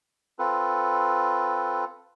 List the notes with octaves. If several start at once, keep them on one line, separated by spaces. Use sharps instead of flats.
C4 F4 A4 B4